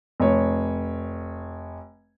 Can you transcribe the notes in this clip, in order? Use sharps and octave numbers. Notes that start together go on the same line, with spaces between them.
F1 C#5